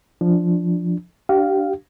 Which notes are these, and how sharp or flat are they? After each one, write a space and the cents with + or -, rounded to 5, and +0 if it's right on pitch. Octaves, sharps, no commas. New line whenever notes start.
F3 +0 D4 +0
D4 +0 G4 -30 F5 +0